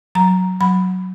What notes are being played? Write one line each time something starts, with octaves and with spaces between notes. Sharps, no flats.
F#3 A#5
F#3 B5